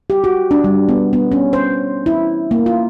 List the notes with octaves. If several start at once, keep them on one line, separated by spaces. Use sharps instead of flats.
G4
F#4
D4
G3
B3
B3
C#4
C5
E4
A#3
F4